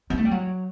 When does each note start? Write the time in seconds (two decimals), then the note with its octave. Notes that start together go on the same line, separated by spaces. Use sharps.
0.10 B3
0.17 A3
0.25 G3
0.31 F#3